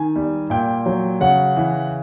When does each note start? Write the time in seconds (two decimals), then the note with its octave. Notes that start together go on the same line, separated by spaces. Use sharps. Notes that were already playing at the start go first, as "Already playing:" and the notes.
Already playing: D#3 G#5
0.16 G3
0.50 A#2 G5
0.86 F#3
1.21 C#3 F#5
1.56 E3